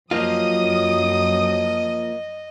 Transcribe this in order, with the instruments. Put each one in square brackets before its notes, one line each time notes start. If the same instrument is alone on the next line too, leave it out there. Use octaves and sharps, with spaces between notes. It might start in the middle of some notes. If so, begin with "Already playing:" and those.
[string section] F#2 D#6 [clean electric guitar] F3 A#3 F4 [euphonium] F#3 [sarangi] D#5